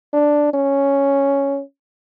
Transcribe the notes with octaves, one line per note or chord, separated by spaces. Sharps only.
D4
C#4